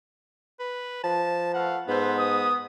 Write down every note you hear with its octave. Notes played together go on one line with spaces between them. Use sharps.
B4
F3 A5
A3 B4 F5 F#5
G#2 B3 A4 B4 C5
D#6